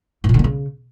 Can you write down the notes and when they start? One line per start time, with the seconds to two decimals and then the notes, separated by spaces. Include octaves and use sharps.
0.24 G#2
0.29 A#2
0.34 D3
0.39 A#3
0.44 C#3